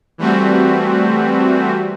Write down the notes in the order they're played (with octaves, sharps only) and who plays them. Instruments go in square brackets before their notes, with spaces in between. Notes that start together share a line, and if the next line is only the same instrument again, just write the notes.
[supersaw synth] E3 G3 A3 C4 F#4